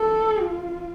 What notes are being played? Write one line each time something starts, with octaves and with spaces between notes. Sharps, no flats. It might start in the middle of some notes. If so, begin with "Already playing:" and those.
Already playing: A4
F4